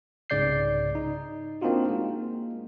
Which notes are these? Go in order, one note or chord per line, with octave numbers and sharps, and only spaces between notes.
C2 G#2 C#3 D5 G6 C7
D#4
A#3 C4 D4 D#4 F4 F#4
G#3 A#3